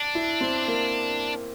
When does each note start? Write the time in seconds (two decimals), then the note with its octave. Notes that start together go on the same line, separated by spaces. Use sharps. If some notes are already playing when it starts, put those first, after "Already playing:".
Already playing: D4
0.15 E4
0.41 C4
0.68 A#3